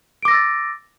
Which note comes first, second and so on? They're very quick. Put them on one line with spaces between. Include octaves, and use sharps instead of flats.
D7 D6 A#6 E6 A6